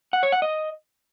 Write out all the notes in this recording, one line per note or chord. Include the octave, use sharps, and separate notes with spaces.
F#5
C#5
F#5
D#5